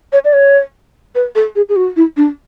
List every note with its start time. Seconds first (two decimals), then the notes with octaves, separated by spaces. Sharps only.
0.13 C#5
0.25 D5
0.33 C#5
1.15 B4
1.35 A4
1.56 G#4
1.69 G#4
1.76 F#4
1.96 E4
2.17 D4